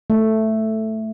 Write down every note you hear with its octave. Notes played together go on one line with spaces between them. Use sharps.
A3